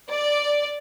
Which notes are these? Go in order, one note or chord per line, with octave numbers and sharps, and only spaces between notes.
D5